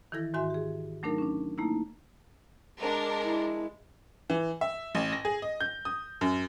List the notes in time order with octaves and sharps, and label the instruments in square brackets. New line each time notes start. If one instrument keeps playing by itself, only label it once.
[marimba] D#3 E3 E4 A4 A#6
G#2 D#3 F#4 E5 G#5 C6
G4 G#4
F#3 A3 D4 D#4 A#4
C#4 D4
A3 A#3 D#4 E4
[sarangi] G#3 [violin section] D4 A#4
[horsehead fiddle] E4
[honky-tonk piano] E3
E5
A1
A#6
G#4
D#5
G6
D#6
F#2